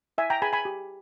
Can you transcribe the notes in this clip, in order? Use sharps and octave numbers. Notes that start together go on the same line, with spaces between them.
E4 E5 G#5
G5 A#5
G#4 B4 G#5 B5
G#5 B5
G4